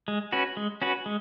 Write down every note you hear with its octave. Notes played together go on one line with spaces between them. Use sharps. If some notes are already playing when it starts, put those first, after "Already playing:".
G#3
C#4 F#4 B4
G#3
C#4 F#4 B4
G#3